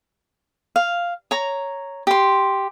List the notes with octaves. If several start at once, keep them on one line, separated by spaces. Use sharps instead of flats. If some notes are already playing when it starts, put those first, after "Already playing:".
F5
C#5 A#5
G4 C6